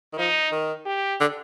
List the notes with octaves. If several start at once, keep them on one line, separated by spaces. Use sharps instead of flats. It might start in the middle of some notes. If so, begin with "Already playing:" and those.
D#3
F3 D#4
D#3
G4
D3